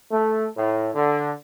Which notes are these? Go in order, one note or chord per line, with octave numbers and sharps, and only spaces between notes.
A3
A2
D3